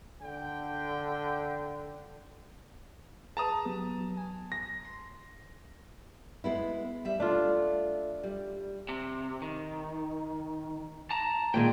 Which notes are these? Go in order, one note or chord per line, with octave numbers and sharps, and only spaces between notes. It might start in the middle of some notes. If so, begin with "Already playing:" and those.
D3 G5
G#4 B4 A5 A#5 D#6
F#3 B3 G4
F#3
G#5
A#6
C6
G#3 B3 E4
G3 E5
A3 D4 F4
G3
C3
D#3
A5 A#5
A#2 D#3 G#3 G5